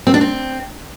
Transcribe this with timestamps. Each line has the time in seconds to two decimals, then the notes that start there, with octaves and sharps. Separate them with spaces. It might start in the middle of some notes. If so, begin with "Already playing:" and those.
0.07 C4
0.14 D4
0.21 C4